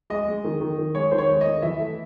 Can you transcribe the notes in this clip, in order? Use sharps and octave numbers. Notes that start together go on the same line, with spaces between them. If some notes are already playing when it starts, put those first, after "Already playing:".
G#3 D#5
G#3
D#3
D#3
D#3
G#3 C#5
D#3 C5
C#5
G#3
D#3 D#5
E3 E5
A3